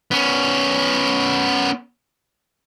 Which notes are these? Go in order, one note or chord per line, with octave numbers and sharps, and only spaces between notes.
B3 C#4